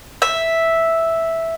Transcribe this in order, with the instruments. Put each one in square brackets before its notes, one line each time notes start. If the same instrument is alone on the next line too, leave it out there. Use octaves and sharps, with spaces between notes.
[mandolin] E5